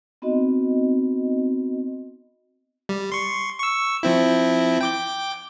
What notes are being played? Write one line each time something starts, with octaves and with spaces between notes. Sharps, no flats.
B3 C4 D#4 F#4 D#5
G3
C6 C#6
C#6 E6
F3 C4 E4
G5 D6 G6